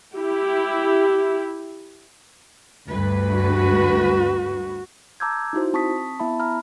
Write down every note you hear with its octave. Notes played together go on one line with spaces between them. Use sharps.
E4 G4
D2 G2 B4
F#4
A5 A#5 D6 E6 G6 G#6
D#4 E4 F#4 C5
C4 A5 C#6 D#6 B6
B3 E4 E5 A5 B5
A#5 B5 F6